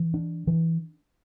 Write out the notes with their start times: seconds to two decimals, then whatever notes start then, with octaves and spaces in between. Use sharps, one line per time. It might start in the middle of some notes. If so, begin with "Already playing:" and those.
Already playing: E3
0.14 D4
0.47 E3